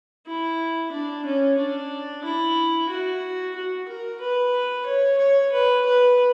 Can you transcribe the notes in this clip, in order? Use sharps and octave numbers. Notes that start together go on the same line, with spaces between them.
E4
D4
C#4
D4
E4
F#4
F#4
A#4
B4
C#5
C#5
B4
B4